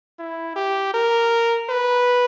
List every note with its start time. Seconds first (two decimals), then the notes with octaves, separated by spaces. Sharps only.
0.19 E4
0.56 G4
0.94 A#4
1.70 B4